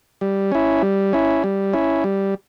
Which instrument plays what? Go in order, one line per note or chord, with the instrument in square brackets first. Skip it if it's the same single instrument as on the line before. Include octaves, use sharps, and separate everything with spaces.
[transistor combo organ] G3
C#4 E4
G3
C#4 E4
G3
C#4 E4
G3